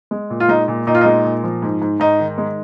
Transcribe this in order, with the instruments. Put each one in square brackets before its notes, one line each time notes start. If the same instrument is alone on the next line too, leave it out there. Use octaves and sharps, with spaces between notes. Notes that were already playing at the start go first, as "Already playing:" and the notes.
[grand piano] G#3
A#2
F4
G#3 D#4
A#2
A#2 D#4
F4
G#3 D#4
A#2
F3
G#2
G#2
G#2 D#4
D#3
G#3